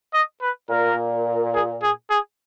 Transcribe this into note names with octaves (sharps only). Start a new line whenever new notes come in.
D#5
B4
A#2 A#4
G#4
G#4
G#4